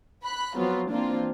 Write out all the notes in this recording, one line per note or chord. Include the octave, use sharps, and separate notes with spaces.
B5 F#6
F3 F#3 B3 C4 F4
E3 A#3 C4 D4 F4